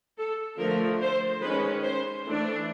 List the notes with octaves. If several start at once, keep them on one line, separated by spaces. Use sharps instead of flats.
A4
D3 F3 A3 A#4
C5
D#3 G#3 C#4 B4
C5
E3 A3 D4